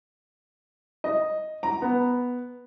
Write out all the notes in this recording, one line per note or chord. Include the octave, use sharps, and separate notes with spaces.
D#5
A#5
B3